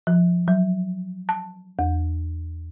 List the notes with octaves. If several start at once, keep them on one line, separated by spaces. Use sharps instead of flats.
F3
F#3
A5
E2